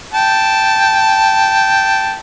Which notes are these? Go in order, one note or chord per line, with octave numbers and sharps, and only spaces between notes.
G5 A5